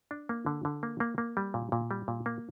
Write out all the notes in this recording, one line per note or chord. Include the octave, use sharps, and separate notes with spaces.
D4
A#3
D3
D3
A#3
A#3
A#3
G3
A#2
A#2
G3
A#2
A#3